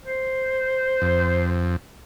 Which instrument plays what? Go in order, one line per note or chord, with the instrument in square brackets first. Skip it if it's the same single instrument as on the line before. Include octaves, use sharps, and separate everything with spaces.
[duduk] C5
[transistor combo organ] F2